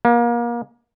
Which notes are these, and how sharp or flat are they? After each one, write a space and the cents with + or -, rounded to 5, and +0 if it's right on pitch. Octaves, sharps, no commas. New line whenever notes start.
A#3 +30